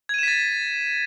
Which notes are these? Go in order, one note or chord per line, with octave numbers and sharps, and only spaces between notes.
G#6 A6 B6 D#7 E7